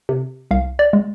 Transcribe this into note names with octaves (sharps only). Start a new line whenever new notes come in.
C3
C2 F5
D5
G#3